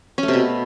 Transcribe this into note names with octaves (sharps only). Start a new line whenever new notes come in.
C#4
A3
C3
B2